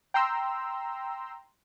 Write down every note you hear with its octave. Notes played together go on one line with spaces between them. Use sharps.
G5 A#5 C6 E6